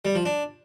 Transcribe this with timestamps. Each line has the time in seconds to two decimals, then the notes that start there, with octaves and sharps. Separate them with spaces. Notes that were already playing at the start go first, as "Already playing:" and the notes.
0.05 G3
0.15 F3
0.25 D4